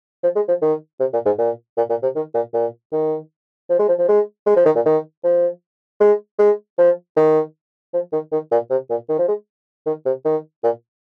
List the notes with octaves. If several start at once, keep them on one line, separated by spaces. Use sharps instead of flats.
F3
G#3
F3
D#3
C3
A#2
G#2
A#2
A#2
A#2
C3
D#3
A#2
A#2
D#3
F3
G#3
F3
F3
G#3
G#3
F3
D#3
A#2
D#3
F3
G#3
G#3
F3
D#3
F3
D#3
D#3
A#2
C3
A#2
D#3
F3
G#3
D#3
C3
D#3
A#2